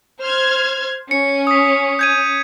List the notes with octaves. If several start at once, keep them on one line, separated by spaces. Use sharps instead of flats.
C5 F6 G#6
C#4 C#7
D#6 B6
G6 G#6 D#7